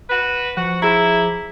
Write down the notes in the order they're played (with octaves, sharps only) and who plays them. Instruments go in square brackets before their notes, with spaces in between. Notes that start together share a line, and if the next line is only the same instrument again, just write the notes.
[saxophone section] F#4 B4
[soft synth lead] F3 [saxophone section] F#4
[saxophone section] E4 [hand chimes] G#4 A#5